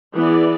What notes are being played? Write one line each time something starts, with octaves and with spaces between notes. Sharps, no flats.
E3 B3 E4 G#4 D5